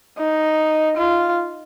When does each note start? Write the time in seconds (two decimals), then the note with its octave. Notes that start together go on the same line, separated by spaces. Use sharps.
0.18 D#4
0.97 F4